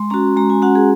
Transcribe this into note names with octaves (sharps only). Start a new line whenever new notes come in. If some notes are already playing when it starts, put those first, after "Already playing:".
Already playing: G#3 C6
C#4 F#4 A#5
G#3 A#5
G#5
C#4 F#4 F#5
G#4